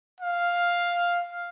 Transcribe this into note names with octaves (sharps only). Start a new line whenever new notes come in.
F5